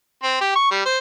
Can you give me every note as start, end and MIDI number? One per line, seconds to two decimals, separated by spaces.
0.23 0.39 60
0.41 0.55 67
0.55 0.68 85
0.71 0.83 55
0.85 0.99 72